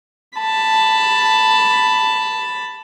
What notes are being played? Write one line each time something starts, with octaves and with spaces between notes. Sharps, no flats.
A5 B5